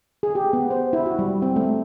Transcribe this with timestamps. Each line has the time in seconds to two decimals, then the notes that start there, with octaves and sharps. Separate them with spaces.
0.23 G#4
0.35 G4
0.53 B3
0.71 C5
0.93 E4
1.06 F#4
1.19 G3
1.42 C4
1.56 A3